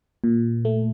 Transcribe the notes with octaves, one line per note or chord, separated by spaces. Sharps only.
A#2
A3